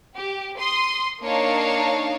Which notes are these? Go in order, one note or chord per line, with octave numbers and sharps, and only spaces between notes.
G4
C6 D#6
A#3 D4 D#4 C#5 F5 A5